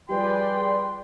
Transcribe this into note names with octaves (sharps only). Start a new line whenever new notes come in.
F3 G3 G4 G#4 B4 D5 G5 C6